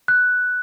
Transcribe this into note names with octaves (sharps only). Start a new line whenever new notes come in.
F#6